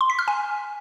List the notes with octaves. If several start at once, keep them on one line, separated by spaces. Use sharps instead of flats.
C6
B6
F6
G#5